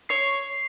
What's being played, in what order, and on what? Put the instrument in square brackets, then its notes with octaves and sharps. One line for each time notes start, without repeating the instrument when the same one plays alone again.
[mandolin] C#5 [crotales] C7